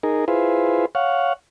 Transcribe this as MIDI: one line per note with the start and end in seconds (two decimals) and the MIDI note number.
0.03 0.25 63
0.03 0.25 68
0.03 0.25 70
0.28 0.86 64
0.28 0.86 65
0.28 0.86 68
0.28 0.86 71
0.28 0.86 72
0.95 1.33 73
0.95 1.33 77
0.95 1.33 78